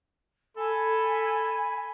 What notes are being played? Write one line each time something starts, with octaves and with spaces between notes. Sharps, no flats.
A4 G#5 B5